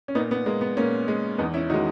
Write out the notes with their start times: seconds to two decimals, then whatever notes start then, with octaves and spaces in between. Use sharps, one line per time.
0.08 C#4
0.15 A#2 B3 D#4
0.31 B3
0.46 G#3 A#3
0.61 B3
0.77 A#2 A#3 C#4
1.08 G#3
1.38 E2 B3 D#4
1.54 C#4 E4
1.70 D#3 G#3 D#4 F#4